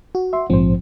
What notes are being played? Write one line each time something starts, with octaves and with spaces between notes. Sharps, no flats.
F#4
E5 C6
A#1 G#2 F3 C4 C5